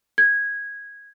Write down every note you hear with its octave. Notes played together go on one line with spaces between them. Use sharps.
G#6